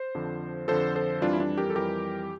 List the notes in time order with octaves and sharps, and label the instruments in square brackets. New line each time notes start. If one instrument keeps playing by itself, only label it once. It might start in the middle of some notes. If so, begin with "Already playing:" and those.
Already playing: [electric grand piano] C5
F2 D3 F3
F2 D3 F3 A4 C5
A4 C5
F2 E3 G3 D4 F4
E4
D4
G4 A#4
A4
F2 E3 G3 G4 A#4